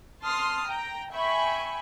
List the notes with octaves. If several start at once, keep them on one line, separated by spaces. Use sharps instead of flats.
A5 C6 D#6 F6
G5 A#5
E5 G5 G#5 B5 C#6